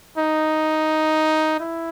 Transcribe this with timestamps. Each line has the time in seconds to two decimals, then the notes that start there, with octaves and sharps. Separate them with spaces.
0.18 D#4
1.60 E4